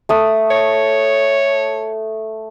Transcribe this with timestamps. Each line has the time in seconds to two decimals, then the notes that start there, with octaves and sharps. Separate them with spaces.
0.09 A3 D#6
0.50 C#5